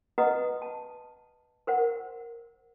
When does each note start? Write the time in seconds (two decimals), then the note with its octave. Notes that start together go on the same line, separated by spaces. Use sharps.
0.18 B4 D#5 F#5 A#5 D#6
0.62 A5
1.67 A#4 C5 F#5